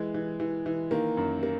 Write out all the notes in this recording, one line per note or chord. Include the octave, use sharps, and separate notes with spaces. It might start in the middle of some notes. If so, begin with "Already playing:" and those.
Already playing: E3 G#3
E3
E3
E3
D#3 A#3
F#2
A#3